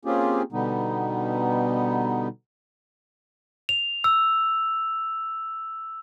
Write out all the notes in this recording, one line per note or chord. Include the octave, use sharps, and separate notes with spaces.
A#3 C4 C#4 F4 G4 G#4
B2 D3 G3 B3 D#4
F7
E6